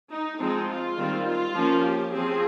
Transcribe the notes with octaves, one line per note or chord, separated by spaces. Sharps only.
D#4
F3 G#3 C4 D#4
F4
D#3 G3 C4
F4
F3 A#3 C#4
G4
F3 C4 G#4